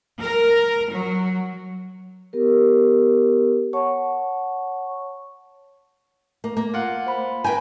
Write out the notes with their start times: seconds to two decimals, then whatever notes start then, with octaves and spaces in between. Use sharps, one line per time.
0.20 A#4
0.93 F#3
2.33 B3 G4 A#4
3.73 C#5 F#5 A5 C#6
6.44 A#3
6.57 A#3
6.74 F4 F#5
7.07 C5 B5
7.44 B4 G5 G#5 A#5 B5 G6